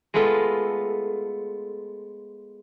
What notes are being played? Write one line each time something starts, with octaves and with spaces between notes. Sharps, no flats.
G#3 A3 B3 F4 A4